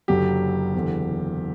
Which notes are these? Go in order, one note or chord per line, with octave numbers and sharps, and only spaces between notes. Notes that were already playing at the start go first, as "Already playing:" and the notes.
F#1 F#2 D3 F#3 G4
F#1 E2 D3